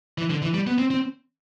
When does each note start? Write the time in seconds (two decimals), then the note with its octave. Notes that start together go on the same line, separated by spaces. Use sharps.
0.18 E3
0.30 D3
0.42 E3
0.54 G3
0.67 B3
0.78 C4
0.91 C4